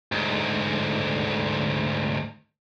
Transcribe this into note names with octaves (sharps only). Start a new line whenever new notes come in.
D2 G#2